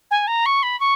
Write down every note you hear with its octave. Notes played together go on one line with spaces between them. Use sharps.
G#5
A#5
C#6
B5
C#6